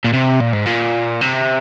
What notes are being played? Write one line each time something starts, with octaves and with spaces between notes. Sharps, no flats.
A#2
C3
A#2
G#2
A#2
C3